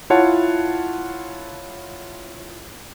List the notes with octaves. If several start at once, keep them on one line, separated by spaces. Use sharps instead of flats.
E4 F4 C#5 F#5 A5